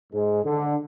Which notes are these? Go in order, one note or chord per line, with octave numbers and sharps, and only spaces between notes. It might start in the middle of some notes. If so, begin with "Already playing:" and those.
G#2 G#3
D3